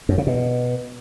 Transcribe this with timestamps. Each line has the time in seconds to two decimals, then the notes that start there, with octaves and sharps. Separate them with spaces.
0.09 F#2
0.18 C#3
0.27 B2